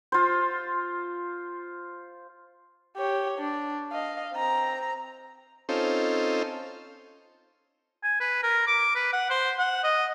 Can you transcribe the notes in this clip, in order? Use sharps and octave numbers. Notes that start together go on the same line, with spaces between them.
F4 C5
G4 C#5
D4
D#5 F5
C4 A#5
C4 C#4 D#4 F4 A4 C5
G#5
B4
A#4
D6
B4
F#5
C5
F#5
D#5